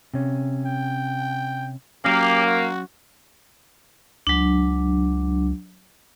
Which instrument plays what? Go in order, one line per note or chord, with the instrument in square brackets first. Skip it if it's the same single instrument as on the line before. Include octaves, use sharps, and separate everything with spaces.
[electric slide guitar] C3 C#4
[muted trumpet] G5
[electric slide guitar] F#3 C#4 [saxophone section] A#3 [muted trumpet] G4
[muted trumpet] F#4
[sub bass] C#2 [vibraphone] F#3 D4